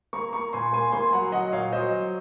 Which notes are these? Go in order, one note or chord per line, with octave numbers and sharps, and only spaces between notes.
A#3 A#5 C#6
A#3 A#5 C#6
A#2 G#5 C6
A#3 G#5 C6
A#3 G#5 C6
F#3 F#5 A#5
F#3 D#5 F#5
A#2 C#5 F5
F#3 C5 D#5
F#3